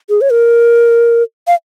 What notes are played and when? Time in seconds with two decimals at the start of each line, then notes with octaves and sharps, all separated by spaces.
0.10 G#4
0.21 C#5
0.31 A#4
1.47 F5